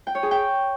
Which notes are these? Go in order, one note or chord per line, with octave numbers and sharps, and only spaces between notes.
G5
C#5
G#4
G5